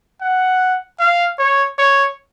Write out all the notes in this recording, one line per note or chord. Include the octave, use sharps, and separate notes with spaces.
F#5
F5
C#5
C#5